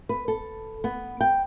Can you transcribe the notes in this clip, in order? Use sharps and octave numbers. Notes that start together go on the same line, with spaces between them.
B4
A4
B3
G5